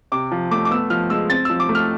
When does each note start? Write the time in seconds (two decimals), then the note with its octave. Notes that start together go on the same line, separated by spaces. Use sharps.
0.12 C3 D6
0.32 F3
0.51 A3 D6
0.65 D6
0.71 B3 E6
0.90 F3 F6
1.10 G#3 E6
1.30 C4 A6
1.45 F3 E6
1.60 D6
1.69 A3
1.75 F6